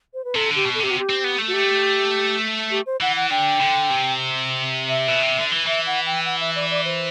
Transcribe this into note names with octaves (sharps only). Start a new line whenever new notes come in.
C5
B4
C3 A4
D3 G4
B2
A4
C3 G4
F#4
G4
C4
B3
A3
F#4
G4
G4
C5
E3 F#5
F#5
D3 G5
D3
C3
E5
B2
C3
D3
E3
E3 E5
F#5
G5
F#5
E5
D5
D5
C5